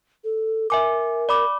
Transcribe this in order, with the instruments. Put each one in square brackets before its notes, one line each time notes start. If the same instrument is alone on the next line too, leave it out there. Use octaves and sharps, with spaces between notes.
[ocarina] A4
[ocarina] A#4 [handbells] E5 G#5 D6
[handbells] D5 B5 D6